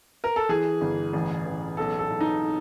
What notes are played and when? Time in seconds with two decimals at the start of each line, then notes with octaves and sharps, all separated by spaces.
0.24 A#4
0.36 A4
0.49 E3 G#4
0.81 G1
1.13 A1
1.45 A1
1.77 B1 A4
1.99 A4
2.10 B1
2.20 D#4